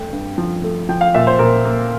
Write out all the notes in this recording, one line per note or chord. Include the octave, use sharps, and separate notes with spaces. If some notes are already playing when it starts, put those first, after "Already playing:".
Already playing: F2 A3 G5
G2
F3
A3
F3 G5
F5
A#2 E5
C5
A#2 A#4
A#3